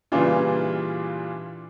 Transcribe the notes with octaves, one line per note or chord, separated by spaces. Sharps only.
A#2 C#3 E3 G3 D4 F4